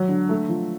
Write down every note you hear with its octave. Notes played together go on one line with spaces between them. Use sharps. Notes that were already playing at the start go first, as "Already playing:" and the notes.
Already playing: F#3
D3
A3
F3